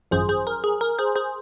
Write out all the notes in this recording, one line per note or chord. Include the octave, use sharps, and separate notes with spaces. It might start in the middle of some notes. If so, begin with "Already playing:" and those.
G#1 F#2 F3 G#4 C5
G#4 C5
A#4
G#4
A#4
G#4 C5
G#4 C5